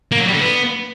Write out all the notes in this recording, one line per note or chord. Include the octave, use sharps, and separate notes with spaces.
A#3
F#3
G3
D3
B3